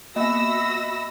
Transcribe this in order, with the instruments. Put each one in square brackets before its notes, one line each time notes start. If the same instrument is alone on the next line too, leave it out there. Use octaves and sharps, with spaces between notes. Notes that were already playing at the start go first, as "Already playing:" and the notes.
[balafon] A#3 B3 [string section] F#4 E6 A#6 [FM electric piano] D#5 E5 [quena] B5